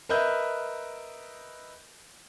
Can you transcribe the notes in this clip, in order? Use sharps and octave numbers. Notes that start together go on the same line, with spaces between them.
A#4 B4 D#5 E5 G6